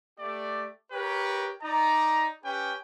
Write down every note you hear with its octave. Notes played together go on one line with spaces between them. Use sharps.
A3 G4 D5
G4 A#4 B4 C#5
D#4 D5 A#5
C#4 G4 B4 G5